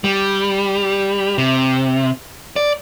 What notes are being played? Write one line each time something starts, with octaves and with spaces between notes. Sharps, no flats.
G3
C3
D5